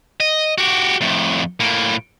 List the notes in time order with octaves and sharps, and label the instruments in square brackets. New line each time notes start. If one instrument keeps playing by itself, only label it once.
[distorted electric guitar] D#5
F#4 G4
F2 A2
A2 A#3